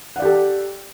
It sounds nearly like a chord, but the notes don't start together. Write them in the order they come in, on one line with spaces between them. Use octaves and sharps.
F#5 D5 G4 A4